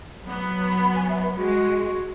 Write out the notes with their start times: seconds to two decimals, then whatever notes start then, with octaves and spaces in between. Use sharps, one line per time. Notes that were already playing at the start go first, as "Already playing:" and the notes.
0.26 F#3 B3
0.81 B5
0.96 G#5
1.09 E5
1.23 B4
1.37 G#3 F#4